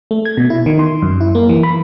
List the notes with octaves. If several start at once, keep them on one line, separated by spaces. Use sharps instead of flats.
A3
G#6
B2
E4
D#3
C6
F#2
E4
A#3
E3
B5